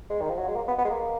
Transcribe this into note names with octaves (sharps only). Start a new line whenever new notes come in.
G#3
D#3
F3
F#3
G#3
A#3
B3
B3
G#3
A#3